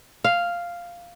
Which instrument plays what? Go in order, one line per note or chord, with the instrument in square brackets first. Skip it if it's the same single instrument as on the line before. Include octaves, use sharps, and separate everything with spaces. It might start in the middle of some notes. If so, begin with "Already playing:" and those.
[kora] F5